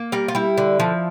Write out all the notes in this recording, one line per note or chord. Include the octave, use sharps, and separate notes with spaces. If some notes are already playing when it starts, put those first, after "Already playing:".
Already playing: A#3
G3 A#4
F4
G3 E4
D3
F3